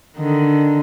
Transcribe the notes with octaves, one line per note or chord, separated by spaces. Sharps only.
D3 D#3